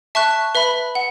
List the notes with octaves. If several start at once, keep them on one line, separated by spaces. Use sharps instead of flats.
E5 A5 C#6 F#6
B4 E5 B5
F#5